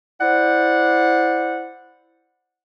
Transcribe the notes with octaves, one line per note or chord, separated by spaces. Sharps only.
E4 C5 D5 F#5